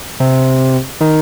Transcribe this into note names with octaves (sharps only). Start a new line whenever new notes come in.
C3
D#3